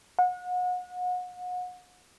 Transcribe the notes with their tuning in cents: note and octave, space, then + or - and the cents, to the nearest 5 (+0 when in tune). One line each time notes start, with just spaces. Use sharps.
F#5 -35